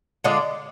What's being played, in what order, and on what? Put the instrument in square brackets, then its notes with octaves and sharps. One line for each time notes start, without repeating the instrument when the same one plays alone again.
[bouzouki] D3 G#3 D4 F4